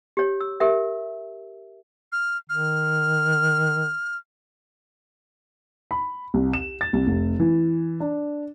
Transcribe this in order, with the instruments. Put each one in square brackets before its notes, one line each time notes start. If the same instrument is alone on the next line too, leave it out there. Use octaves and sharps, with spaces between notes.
[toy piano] G4 C#5
E6
G4 A#4 E5
[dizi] F6
[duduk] D#3 [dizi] F6
[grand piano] B5
C2
E7
A6
C2
F1
E3
D4